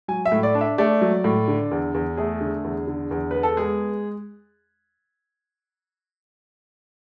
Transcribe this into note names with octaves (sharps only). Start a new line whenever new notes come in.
F#3 G#5
E5
A2
D5
D4
E5
A3 D5
F#3
A2
D3
E2
E2
A3 G#4
D3
E2
D3
E2
B3 B4
A4
G#3 G#4